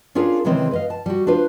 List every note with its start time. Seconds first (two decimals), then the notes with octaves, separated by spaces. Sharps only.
0.15 C#4 D4 F4 G#4 A#4
0.44 C3 D#3 E3 G#3 C4 C#4
0.71 B4 D#5 F5
0.90 A5
1.06 G3 F#4
1.27 D4 F4 B4 C5